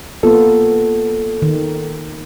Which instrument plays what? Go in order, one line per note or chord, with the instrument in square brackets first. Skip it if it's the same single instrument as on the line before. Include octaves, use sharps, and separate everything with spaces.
[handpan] A#3 B3 F4 [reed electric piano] A4
[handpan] D#3